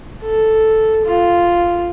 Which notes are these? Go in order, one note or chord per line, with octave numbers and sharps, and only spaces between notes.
A4
F4